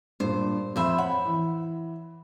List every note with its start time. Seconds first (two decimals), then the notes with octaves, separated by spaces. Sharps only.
0.20 G2 A#2 C5
0.76 F2 C5 E5 B5
0.98 C#5 F#5 B5
1.26 E3